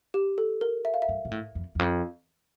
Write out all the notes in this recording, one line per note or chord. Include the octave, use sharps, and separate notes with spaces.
G4
A4
A#4
E5
F5
E5
G2
A#2
A2
F2
E2
F2